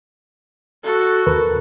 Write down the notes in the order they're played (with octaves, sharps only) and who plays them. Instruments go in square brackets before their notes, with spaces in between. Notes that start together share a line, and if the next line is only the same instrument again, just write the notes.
[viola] F#4 A4
[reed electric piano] D#2 A#4 B4